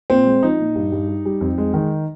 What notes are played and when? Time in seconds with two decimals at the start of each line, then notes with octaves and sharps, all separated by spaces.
0.10 A#2 C4
0.26 G#3
0.43 F3 D#4
0.60 A#2
0.76 G2
0.92 G2
1.09 G3
1.26 G3
1.41 F2
1.58 G#3
1.74 D#3